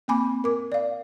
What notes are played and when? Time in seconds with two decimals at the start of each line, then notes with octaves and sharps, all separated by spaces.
0.08 A#3 C4 G#5 B5 D6
0.44 A#4 D6
0.72 D5 F5